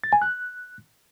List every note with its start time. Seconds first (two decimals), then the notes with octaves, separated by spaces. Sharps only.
0.04 A6
0.13 G#5
0.22 F#6